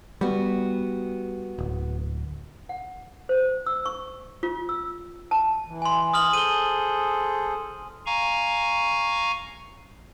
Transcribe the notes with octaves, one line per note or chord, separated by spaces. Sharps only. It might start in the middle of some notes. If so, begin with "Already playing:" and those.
G3 B3 F#4
D1
F#5
C5
E6
C#6
F4
E6
A5
E3
G#5 C6
D#6 F6 F#7
G#4 A4 C5 D#7 G7
F5 G#5 A#5 C#6